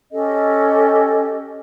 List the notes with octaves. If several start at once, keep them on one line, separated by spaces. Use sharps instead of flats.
C#4 G4 A4 D#5